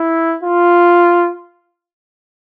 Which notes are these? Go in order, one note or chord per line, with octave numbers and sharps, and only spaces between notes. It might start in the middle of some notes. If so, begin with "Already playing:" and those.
Already playing: E4
F4